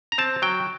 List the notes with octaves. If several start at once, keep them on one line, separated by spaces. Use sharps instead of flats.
A#5
C4 A5
F#3 G5